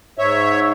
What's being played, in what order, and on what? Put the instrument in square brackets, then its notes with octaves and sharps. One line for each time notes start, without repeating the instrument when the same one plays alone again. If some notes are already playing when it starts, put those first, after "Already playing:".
[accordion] G#2 C#5 E5